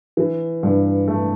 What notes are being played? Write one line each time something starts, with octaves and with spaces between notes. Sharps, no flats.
E3
G2
A3